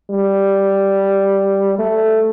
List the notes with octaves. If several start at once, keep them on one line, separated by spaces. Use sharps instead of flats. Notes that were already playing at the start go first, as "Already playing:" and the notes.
G3
A3